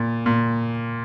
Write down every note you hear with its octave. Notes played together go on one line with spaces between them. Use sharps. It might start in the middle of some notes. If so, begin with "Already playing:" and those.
Already playing: A#2
A#2